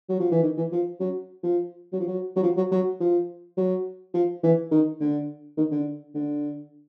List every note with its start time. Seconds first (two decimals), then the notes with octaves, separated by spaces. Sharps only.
0.09 F#3
0.20 F3
0.32 E3
0.43 D#3
0.57 E3
0.72 F3
1.00 F#3
1.43 F3
1.93 F#3
2.00 F3
2.07 F#3
2.36 F#3
2.43 F3
2.57 F#3
2.72 F#3
3.00 F3
3.57 F#3
4.14 F3
4.43 E3
4.71 D#3
5.00 D3
5.58 D#3
5.72 D3
6.15 D3